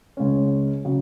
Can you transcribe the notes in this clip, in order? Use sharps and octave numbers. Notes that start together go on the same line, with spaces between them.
C#2 C#3 G#3 C#4
C#3 F#3